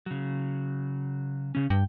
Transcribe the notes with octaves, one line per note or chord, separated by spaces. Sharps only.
C#3 F#3
C#3 C#4
G2 G5